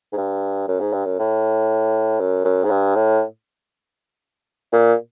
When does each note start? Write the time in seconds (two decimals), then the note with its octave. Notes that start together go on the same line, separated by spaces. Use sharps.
0.13 G#2
0.17 G2
0.68 F#2
0.80 G#2
0.93 G2
1.05 F#2
1.19 A2
2.20 F#2
2.44 F#2
2.64 G#2
2.70 G2
2.96 A2
4.73 A#2